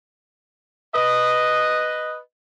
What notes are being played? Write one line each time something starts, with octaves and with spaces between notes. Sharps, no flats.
B4 D#5